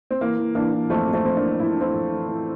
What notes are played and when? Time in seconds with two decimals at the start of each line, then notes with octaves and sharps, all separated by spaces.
0.11 C4
0.21 E3 A#3
0.38 E3
0.55 E3 A#3 D4
0.73 E3
0.90 F2 A3 C4
1.07 F2
1.13 A3 C4
1.25 F2 C4
1.36 A#3 D4
1.42 E3
1.60 F2 E4
1.71 D4
1.77 E3 C4 E4
1.94 F2
2.12 E3
2.29 E3